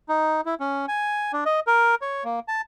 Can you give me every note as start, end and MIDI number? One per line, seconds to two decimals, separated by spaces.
0.09 0.41 63
0.46 0.55 64
0.60 0.86 61
0.88 1.32 80
1.33 1.44 62
1.45 1.60 75
1.67 1.95 70
2.02 2.24 73
2.24 2.40 58
2.48 2.61 81